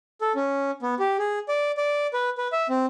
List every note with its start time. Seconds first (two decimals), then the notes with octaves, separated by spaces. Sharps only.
0.21 A4
0.36 C#4
0.82 B3
0.99 G4
1.19 G#4
1.49 D5
1.77 D5
2.13 B4
2.38 B4
2.53 E5
2.69 C4